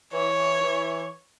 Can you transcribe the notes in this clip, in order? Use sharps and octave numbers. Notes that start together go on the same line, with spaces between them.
E3 C#5
E3